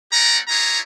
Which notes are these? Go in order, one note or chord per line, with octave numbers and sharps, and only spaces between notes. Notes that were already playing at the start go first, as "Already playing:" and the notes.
A3 C#4 G4 D5 F#5 A#5
D4 E4 F4 G#4 C#5 A#5